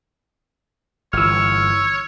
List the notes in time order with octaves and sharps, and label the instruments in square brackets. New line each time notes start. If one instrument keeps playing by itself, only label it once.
[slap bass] G1 E3 [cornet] C#5 [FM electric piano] E6 F6